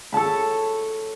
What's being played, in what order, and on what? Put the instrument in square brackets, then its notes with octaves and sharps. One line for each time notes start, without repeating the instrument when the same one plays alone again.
[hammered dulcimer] A4 C#5 A5 B5